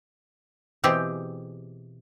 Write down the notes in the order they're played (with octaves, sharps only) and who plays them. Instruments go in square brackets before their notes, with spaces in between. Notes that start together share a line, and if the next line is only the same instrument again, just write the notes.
[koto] B2 E3 C4 G4 G#4